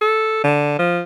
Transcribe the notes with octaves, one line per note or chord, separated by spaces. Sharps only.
A4
D3
F3